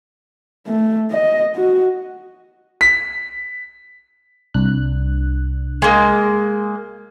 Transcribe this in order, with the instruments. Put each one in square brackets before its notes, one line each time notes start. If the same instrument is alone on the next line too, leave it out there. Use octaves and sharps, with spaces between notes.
[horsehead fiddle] A3
D#5
F#4
[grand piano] B6
[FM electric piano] C2 D4 F#6
[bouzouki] G#3 A#3